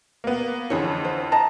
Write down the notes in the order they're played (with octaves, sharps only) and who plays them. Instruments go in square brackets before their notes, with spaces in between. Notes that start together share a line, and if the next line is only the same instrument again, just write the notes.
[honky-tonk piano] A#3 B3
[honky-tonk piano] F2 D3 E3 [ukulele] F4 G#4 C#5
[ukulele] C5
D#5 A5 A#5